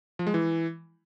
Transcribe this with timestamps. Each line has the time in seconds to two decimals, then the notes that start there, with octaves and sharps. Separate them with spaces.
0.19 F3
0.27 G#3
0.34 E3